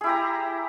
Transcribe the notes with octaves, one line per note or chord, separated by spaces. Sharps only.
E4 G4 G#4 A#5